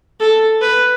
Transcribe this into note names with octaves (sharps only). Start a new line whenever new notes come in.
A4
B4